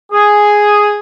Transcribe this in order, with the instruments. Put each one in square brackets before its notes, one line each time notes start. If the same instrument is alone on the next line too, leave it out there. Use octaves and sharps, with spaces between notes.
[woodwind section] G#4